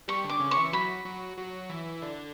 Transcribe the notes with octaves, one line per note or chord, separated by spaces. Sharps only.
G3 G4 C#6
D3 D4
D6
C#3 C#4
C#6
E3 E4
F#3 F#4 B5
F#3 F#4
F#3 F#4
E3 E4
D3 D4